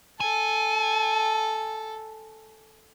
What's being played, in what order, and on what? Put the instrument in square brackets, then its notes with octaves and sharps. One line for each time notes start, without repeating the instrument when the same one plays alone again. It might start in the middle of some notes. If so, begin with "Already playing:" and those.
[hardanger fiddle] A4 [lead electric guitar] G#5